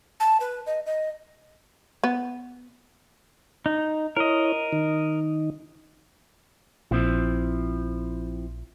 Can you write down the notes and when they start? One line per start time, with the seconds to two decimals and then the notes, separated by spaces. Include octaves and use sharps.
0.20 A5
0.40 B4
0.66 D#5
0.86 D#5
2.04 B3
3.66 D#4
4.17 E4 A#4 C#5 D#5
4.72 D#3 D#4
6.91 A#1 F3 C4 E4